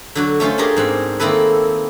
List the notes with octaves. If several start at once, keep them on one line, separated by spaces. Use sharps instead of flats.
D3 F#3 F#4
A3 C#4 F4 C5
D4 F4 G4 G#4 A#4
G#2 C4 F#5
D#3 A#3 C4 E4 A4 B4